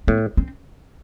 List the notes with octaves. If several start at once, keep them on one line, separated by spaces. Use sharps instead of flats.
A2 B3
C4